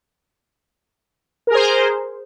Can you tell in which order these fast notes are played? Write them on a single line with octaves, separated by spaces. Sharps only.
A#4 G#4 C5